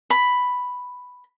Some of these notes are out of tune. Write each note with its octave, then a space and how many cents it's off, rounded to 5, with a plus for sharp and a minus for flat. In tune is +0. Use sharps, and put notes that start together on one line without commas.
B5 +5